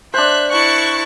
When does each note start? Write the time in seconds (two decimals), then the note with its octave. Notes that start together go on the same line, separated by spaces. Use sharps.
0.14 D4 C5 E5 F#6
0.51 E4 A5 C#6 F#6